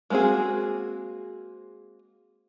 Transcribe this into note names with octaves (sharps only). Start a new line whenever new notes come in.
G#3 A#3 C4 F#4 G#4